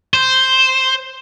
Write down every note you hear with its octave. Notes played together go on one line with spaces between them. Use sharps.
C5